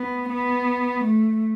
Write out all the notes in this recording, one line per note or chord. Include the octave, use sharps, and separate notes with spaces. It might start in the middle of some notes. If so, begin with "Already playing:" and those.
Already playing: B3
B3
A3